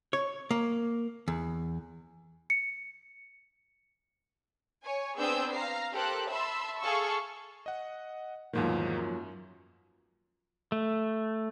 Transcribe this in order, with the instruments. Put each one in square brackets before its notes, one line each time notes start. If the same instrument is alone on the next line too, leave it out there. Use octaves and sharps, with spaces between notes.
[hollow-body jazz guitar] C#5
A#3
E2
[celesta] C#7
[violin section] C#5 G#5
B3 C4 D4 G#4 E6 G6
F5 A#5 C7
G4 A4 A#4 C5 F#6
E5 A5 B5 C6 E6
G#4 A4 F5 A5 C#6 E6
[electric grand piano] D#5 F#5
[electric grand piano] E2 G#2 D#3 [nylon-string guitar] F3 F#3 A#3
[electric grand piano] F#2
[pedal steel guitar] A3